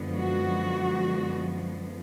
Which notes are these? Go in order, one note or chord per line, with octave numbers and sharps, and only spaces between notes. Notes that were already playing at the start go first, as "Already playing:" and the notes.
Already playing: F#2 D3 F3 G#3 B3
F#4